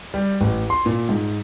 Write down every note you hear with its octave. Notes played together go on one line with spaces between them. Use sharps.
G3
A1
C6
A#2
G#2